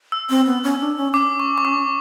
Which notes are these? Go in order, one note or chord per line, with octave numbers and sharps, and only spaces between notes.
E6
C4
B3
C#4
D4
C#4
C#4 D6
C#6
C#6
D6